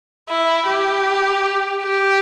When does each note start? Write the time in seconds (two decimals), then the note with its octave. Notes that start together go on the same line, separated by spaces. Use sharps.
0.29 E4
0.67 G4
1.82 G4